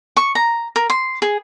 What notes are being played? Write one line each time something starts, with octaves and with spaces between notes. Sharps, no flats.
C#6
A#5
A#4
C6
G#4